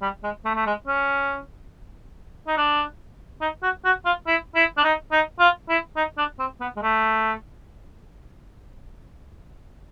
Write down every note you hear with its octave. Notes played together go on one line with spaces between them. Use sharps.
G3
G#3
A3
A3
G#3
C#4
D#4
D4
D#4
F#4
F#4
F4
E4
E4
D4
D#4
D#4
F4
E4
D#4
D4
C4
B3
G#3
A3